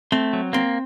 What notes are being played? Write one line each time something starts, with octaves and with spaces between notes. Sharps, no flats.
A3 C4
F#3
A#3 C4